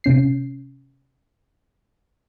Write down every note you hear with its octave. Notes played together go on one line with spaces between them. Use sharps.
C3 C#4 C7